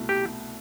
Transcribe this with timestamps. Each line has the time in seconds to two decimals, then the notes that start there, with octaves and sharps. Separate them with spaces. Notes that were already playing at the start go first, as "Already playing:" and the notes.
Already playing: C2 B2 A3 E4
0.09 G4